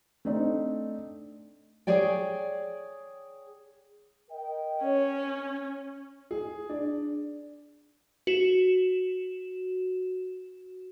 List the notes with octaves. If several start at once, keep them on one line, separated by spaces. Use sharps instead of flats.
A3 C4 D4 D#4
G#4 C#5 D5 G5
A#4 D#5 G5
C#4 C#5
G#4
D4
F#4 E7